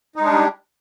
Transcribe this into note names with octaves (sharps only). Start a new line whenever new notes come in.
G3 G#3 D4 D#4